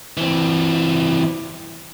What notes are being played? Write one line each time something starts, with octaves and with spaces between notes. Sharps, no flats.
E3 C4